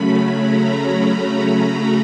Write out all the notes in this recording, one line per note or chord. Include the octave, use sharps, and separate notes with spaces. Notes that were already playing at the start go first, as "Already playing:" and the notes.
Already playing: C#3 F#3 A3 C#4 B5
A#5